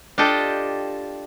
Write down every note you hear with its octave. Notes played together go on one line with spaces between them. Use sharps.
D4 F4 G4 A4 D#5 G5